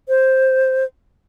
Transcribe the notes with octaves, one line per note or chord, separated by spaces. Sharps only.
C5